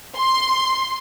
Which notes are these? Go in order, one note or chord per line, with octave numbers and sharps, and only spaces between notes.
C6